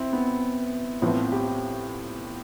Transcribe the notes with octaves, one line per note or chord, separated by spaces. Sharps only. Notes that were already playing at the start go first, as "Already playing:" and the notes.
Already playing: C4 E4
B3
A1 A2 F3 B3 C4
G4